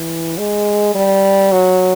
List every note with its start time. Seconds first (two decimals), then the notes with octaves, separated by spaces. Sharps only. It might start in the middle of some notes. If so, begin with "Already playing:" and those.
Already playing: E3
0.38 G#3
0.95 G3
1.52 F#3